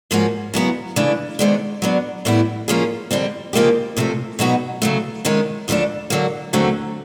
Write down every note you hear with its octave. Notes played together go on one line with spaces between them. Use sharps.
G#2 F3 A#3 C#4 F#4
C#3 F#3 B3 E4
C#3 E3 A3 D4
C3 D#3 G#3 B3 D4
F#3 B3 D4
A2 E3 G3 B3 E4
F3 A#3 C#4 F4 G#4
F2 D3 G3 C4
C#3 F3 A#3 D#4 G4
D2 C3 F3 A3
B2 F#3 B3 D#4 F#4
C#3 F#3 A3
C3 D#3 G#3 C#4
D2 C#3 F3 A3 D4
D3 F#3 A#3
D#2 D3 F#3 A3 C4